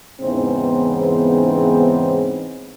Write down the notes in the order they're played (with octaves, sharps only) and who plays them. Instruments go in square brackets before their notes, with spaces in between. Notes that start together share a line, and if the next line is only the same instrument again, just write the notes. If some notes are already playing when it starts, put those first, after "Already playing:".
[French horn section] E2 G#2 C#3 E3 B3 C4